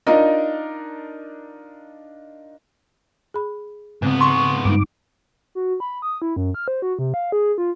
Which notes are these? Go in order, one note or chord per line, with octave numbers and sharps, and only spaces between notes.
D4 D#4 F4 A#4 D#5
G#4 B5
G#2 C#3 B3 C4
C6 C#6
G2 G#3 D#4 D6
F#4
B5
D#6
E4
F#2
F6
C5
F#4
C3
F5
G#4
F4